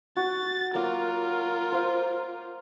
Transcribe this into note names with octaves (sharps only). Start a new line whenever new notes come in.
F#4 A6
F#3 A#3 F4 A#4
C5 F5